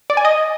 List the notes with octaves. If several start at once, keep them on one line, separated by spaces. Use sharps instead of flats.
D5
G#5
D#5